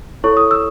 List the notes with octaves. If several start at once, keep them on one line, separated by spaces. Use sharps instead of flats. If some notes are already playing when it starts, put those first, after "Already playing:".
E4 A4 C#5 C#6
D#6
E6